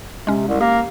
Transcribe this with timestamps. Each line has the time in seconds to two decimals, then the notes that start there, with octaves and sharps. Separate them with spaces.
0.27 C3 G#3 C#4
0.48 C2
0.61 A#3 G4